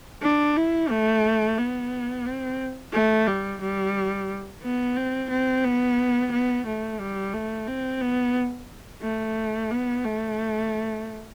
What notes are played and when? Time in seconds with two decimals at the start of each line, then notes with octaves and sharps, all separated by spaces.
0.22 D4
0.56 E4
0.90 A3
1.57 B3
2.25 C4
2.93 A3
3.27 G3
3.61 G3
4.63 B3
4.96 C4
5.30 C4
5.64 B3
6.32 B3
6.66 A3
7.00 G3
7.33 A3
7.67 C4
8.01 B3
9.02 A3
9.70 B3
10.04 A3